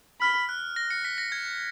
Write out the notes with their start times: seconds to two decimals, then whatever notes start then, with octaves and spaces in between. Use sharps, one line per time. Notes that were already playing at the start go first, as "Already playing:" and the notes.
0.21 B5 F6
0.49 F#6
0.76 A#6
0.90 C#7
1.05 B6
1.18 A#6
1.32 G#6